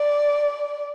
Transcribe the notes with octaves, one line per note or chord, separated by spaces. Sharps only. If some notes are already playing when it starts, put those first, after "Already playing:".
Already playing: D5